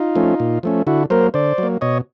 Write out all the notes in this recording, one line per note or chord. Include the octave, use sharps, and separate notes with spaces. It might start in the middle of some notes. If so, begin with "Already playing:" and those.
Already playing: D#4 F4
F3 A3 C#4
A#2
F3 A3 C#4
D3 E4 F#4
F#3 A#3 A#4 C5
D3 C5 D5
F#3 A#3
B2 C#5 D#5